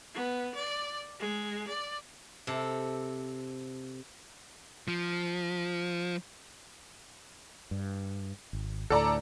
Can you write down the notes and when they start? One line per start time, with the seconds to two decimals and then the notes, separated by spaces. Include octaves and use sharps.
0.14 B3
0.55 D5
1.20 G#3
1.68 D5
2.47 C3 A4
4.88 F3
7.71 G2
8.53 G#1
8.90 D2 A2 A4 D5 A#5